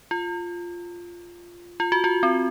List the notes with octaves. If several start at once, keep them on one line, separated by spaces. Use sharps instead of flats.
F4
F4
F#4
F4
C4